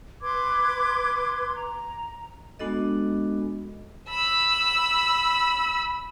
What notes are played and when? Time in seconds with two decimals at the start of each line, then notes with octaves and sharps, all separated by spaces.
0.21 B4 C6 D6 G#6
1.54 A#5
2.59 G#3 B3 D4 F#4 A4 D#5
4.09 B5 E6